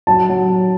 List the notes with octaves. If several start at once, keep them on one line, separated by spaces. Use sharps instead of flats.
F#3 A5
F#3
F#3